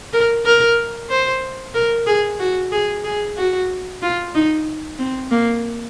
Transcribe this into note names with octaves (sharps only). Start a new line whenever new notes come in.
A#4
A#4
C5
A#4
G#4
F#4
G#4
G#4
F#4
F4
D#4
C4
A#3